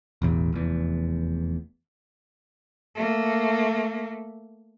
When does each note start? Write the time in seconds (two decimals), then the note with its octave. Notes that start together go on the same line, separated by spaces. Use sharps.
0.22 E1 A1 E2
0.53 F1 E2
2.95 A3 A#3